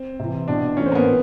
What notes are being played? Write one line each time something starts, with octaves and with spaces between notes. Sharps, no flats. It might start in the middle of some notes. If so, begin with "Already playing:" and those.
Already playing: C4
C3 E3
B2 D4
A2 E3 C#4
C4
A#3
B3
A#2